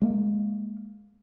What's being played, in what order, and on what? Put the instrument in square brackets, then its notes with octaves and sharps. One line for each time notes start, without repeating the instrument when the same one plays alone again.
[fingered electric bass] G#3 A#3